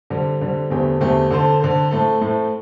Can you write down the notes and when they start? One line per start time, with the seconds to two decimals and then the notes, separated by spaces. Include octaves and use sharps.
0.10 D3 G3 C4
0.41 D3 G3 C4
0.70 E2 D3 A3 C4 G4
1.00 E2 D3 A3 C4 G4
1.31 D3 C4 A4 C5
1.60 D3 C4 A4 C5
1.91 A2 A3 C4 A4
2.21 A2 A3 C4 A4